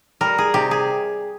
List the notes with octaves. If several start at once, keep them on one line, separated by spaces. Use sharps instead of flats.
G3 A#4
G#4
C3 G4
G#4